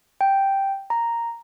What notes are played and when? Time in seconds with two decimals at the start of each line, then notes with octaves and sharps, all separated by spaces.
0.21 G5
0.90 A#5